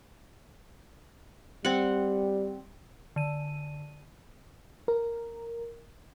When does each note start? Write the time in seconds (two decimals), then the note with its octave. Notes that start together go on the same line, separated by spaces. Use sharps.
1.65 G3 C4 F#5
3.16 D3 D#7
4.88 A#4